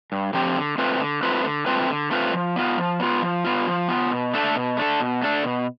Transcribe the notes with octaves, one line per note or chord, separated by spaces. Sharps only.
G2
D3 F3 C4 G4
D3
A3 C4 F4 B4
D3
A3 C4 F4 B4
D3
A3 C4 F4 B4
D3
A3 C4 F4 B4
F3
B3 F4
F3
B3 F4
F3
B3 F4
F3
B3 F4
B2
A3 D4 A4
B2
A3 D4 A4
B2
A3 D4 A4
B2